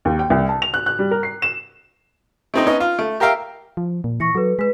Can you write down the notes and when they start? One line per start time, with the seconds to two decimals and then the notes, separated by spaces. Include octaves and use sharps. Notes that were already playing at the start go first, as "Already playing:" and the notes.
0.05 D#2
0.19 G5
0.30 C2
0.49 A5
0.62 F7
0.74 F#6
0.86 F#6
0.99 G3
1.11 A#4
1.23 C7
1.42 E7
2.54 A3 C4 D#4
2.66 B3 C#4 D#4
2.80 F4
2.99 A3
3.20 G4 A#4 E5 F5 G5
3.77 F3
4.04 A#2
4.20 E3 C#6 A#6 C#7
4.35 F#3 A4 B4
4.59 G#3 B4 B6